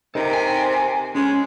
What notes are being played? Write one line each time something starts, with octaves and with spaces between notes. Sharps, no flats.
C3 D#4 A4 A#4 G5
G#5
G#3 C#4